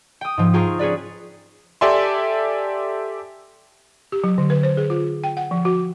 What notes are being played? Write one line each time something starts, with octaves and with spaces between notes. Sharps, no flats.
G5 D#6
G#2 F3
F4 G#4 G5 A#5 C#6
C#4 G#4 B4 D5
G4 A4 D5 E5 G#5 C6
G4
F#3
D3
B4
C5
G#4
F4
G5
F#5
F3
F#4